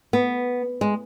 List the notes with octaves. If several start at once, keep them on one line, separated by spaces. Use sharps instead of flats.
B3
G#3